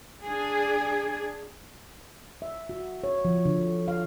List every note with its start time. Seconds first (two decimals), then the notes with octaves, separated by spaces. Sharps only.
0.23 D4 G#4
2.42 E5
2.69 F#4
3.04 C#5
3.25 F3
3.45 D3
3.88 F5